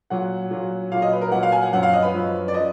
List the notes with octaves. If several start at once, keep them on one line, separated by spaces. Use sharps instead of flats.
A#2 F#3 F#5
A#2 F#3
A#2 F#3 F5
D#5
B4
A#4
A#2 F#3 F#5
F5
G#5
F#5
F#2 F3 F#5
F5
D#5
B4
F#2 F3
D5
F3 D#5